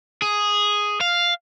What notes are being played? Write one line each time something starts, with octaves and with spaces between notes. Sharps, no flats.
G#4
F5